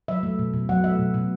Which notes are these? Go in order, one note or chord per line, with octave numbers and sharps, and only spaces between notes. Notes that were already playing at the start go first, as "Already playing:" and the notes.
F#3 E5
A3
B2
B2
F#3 F#5
A3 E5
B2
B2